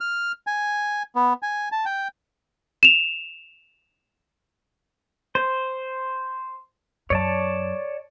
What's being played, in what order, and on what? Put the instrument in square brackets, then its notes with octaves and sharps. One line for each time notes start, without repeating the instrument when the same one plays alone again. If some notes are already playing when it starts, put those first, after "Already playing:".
[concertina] F6
G#5
B3
G#5
A5
G5
[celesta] E7 F7
[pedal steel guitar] C5
[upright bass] F#2 [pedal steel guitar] C#5 D5 A5